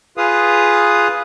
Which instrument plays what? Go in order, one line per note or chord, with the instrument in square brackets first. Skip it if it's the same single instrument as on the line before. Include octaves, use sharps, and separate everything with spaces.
[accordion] F4 G#4 B4 F5 D#6